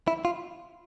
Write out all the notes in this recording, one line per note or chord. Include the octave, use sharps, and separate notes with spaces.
E4
F4